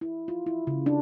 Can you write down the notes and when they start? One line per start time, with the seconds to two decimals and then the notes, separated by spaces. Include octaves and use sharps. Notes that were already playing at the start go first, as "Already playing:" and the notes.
0.01 E4
0.28 F4
0.46 E4
0.67 C#3
0.86 D4